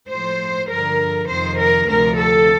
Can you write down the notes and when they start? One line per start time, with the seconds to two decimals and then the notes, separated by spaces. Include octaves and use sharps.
0.10 A2 F3 C5
0.70 G2 D3 F3 A#4
1.29 F2 C3 D#3 C5
1.59 A#4
1.88 D2 C3 F3 A#4
2.19 A4